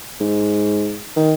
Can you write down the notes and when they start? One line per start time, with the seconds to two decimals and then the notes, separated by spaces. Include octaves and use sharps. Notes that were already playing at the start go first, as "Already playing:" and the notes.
0.20 G#2
1.16 D#3